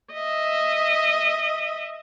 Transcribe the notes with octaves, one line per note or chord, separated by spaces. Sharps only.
D#5 E5